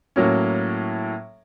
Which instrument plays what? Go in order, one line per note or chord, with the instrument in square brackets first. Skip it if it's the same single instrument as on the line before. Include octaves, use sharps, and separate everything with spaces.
[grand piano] A2 F#3 A#3 C#4